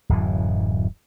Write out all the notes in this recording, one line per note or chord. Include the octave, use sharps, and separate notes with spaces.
D1 F#2 E3